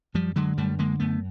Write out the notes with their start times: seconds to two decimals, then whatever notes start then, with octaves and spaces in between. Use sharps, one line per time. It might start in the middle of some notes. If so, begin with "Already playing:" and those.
0.14 F#2 F3 G3
0.36 D3 F#3 G#3
0.58 F#2 G3 A3
0.79 D3 G#3 A#3
1.00 F#2 A3 B3